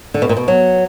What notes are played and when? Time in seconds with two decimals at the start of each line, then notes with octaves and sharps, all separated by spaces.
0.14 D3
0.22 B2
0.29 A#2
0.37 B2
0.48 F#3